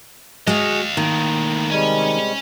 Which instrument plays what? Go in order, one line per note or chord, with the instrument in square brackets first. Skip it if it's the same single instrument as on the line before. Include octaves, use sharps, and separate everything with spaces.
[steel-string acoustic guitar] G#3 F#4 [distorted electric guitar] D#5 F5
[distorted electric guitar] A2 A#3 [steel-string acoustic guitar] D#3
[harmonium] C3 G3 G#3 [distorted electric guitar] C#4 G#5